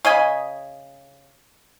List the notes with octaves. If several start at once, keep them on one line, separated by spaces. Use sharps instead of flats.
C#3 D#5 G#5 B5